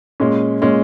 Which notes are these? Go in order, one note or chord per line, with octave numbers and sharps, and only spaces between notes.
A#2 G#3 C#4
A#2 G#3 C#4